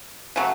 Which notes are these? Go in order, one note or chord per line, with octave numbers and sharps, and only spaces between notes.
C#3 F#3 A3